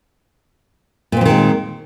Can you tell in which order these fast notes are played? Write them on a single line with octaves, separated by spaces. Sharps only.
A#2 C4 F3 D#3 G#3